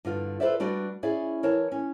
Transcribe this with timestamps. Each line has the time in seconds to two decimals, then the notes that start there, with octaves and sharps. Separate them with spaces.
0.05 G2 D3 F4
0.40 F4 A4 B4 C5 D5 E5
0.60 G3 D4 F#4 B4 D5
1.03 C#4 E4 G#4 D5
1.43 E3 A#4 C#5 A5
1.72 C#4